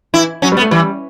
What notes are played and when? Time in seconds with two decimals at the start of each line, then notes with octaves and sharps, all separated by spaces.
0.14 E3 E4
0.42 F#3 C#4
0.52 G3
0.57 B3
0.62 A3
0.71 E3 G3